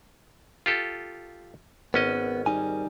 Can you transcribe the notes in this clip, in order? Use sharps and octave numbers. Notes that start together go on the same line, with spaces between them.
F4 G4 A4
G#1 B3 C#4 D#5
G3 D#4 G#5